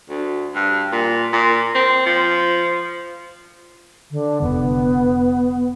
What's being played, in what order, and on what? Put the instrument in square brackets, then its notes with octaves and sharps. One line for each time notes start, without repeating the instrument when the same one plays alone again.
[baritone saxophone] D2
G2
A#2
A#2
C4
F3
[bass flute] D3
[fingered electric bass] F1 D3 [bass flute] B3